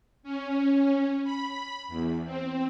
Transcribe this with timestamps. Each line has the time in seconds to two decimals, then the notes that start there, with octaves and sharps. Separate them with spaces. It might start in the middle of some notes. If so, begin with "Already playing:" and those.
0.23 C#4
1.24 B5
1.88 E2
2.25 C4